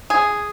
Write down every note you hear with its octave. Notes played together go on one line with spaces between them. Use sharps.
G#4